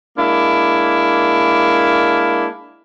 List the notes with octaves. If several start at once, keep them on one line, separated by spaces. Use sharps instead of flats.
G#3 A#3 D4 E4